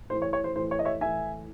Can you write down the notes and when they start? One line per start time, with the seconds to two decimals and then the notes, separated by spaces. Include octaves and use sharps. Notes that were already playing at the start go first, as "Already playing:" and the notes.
0.10 A2 E3 C5
0.22 C#5
0.33 C#5
0.44 C5
0.56 A2 E3 C5
0.71 C#5
0.79 D#5
0.85 C#5 E5
1.01 A2 E3 E5 G#5